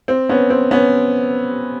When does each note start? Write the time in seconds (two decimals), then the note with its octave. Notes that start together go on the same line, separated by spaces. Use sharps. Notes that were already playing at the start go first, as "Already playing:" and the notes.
0.08 C4
0.29 B3 C#4
0.50 C4
0.71 B3 C#4